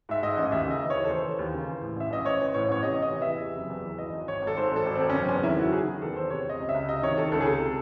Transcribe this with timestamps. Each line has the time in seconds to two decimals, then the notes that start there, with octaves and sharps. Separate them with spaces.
0.09 G#2 E5
0.23 G#2 D#5
0.37 A1
0.51 D#2 E5
0.66 C#3 D#5
0.80 E3
0.90 D#2 C#5
1.04 A4
1.10 E3 C5
1.24 E3
1.39 D#2
1.53 C#3
1.68 E3
1.82 A2
1.96 A1 E5
2.11 A1 D#5
2.25 A1 C#5
2.40 E3
2.54 A2 C#5
2.68 A1 C#5
2.83 C3 D#5
2.97 C3 D#5
3.12 E3
3.22 E2 E5
3.41 C3
3.56 F#1
3.70 E2
3.84 E3
3.98 G#1 D#5
4.13 G#1
4.28 G#1 C#5
4.42 G#1
4.47 A4
4.57 G#2 C5
4.71 G#1 A4
4.86 G#1
4.95 C4
5.00 G#1
5.10 C#4
5.15 F#1 C4
5.29 E2 C#4
5.43 D#3 E4
5.58 F#1 F#4
5.73 D#3 G#4
5.87 D#3
6.01 E2 A4
6.16 E2 C5
6.30 C3 C#5
6.45 C3 D#5
6.60 C#2
6.69 E5
6.74 C#2
6.89 C3 D#5
7.02 D#3 C#5
7.17 D#3 A4
7.32 C#2 A4
7.41 G#4
7.46 C3 A4